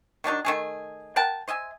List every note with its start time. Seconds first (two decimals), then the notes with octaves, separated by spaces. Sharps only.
0.24 D#3 F#3 D4 D#4
0.45 D#3 A3 G#4
1.16 A#4 F#5 G5 A5
1.48 C5 D#5 E5 G#5